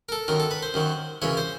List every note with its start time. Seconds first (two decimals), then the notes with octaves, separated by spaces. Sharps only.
0.09 A#4
0.12 A4
0.28 F#2 D#3 F#3 A#4
0.40 A4
0.51 B4
0.62 C5
0.74 F#2 D#3 F#3
1.22 F#2 C#3 E3 C#5
1.37 C5